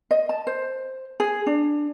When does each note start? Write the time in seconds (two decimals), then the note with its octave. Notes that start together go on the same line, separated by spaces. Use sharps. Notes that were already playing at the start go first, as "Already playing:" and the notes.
0.11 D#5
0.29 A5
0.47 C5
1.20 G#4
1.46 D4